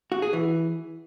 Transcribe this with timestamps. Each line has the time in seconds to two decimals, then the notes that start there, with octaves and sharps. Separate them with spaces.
0.12 F#4
0.22 G#4
0.33 E3